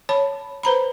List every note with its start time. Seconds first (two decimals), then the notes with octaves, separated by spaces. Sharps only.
0.09 C#5 A5 B5
0.63 B4 C5 A#5 B5